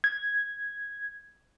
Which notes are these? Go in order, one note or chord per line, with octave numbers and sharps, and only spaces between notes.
G#6